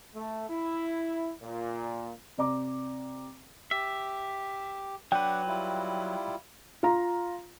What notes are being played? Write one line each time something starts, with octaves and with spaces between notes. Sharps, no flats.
A3
E4
A#2
C3 C4 D5 A#5 D6
G4 E5
F#3 D4 B4 F#5 G5
G3 E4 F4
F4 A#5